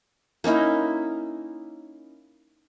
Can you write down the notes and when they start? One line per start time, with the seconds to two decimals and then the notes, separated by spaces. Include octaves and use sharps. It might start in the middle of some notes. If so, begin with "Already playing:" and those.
0.44 A#3 C#4 D#4 E4